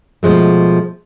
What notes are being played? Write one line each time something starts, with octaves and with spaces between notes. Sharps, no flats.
B2 F3 G#3 A3